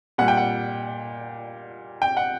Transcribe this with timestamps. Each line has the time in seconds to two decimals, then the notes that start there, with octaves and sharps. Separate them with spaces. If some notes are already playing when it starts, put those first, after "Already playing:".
0.18 A#2 G3 F#5
0.28 G5
0.37 F#5
2.02 G5
2.17 F#5